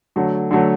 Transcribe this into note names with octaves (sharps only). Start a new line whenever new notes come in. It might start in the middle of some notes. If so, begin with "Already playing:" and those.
D3 F#3 A3
D3 F#3 A3